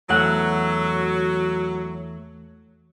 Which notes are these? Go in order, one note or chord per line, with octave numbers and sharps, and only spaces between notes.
E2 F#3 A3 F#5